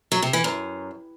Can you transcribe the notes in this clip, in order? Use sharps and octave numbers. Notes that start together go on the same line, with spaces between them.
F#3
C3
E3
F#2